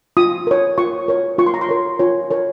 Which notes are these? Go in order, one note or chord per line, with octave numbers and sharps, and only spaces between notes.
F4 D#6
A#4 C#5
F4 C#6
A#4 C#5
F4 C#6
C6
A#5
C6
A#4 C#5
F4 C#5
A#4 C#5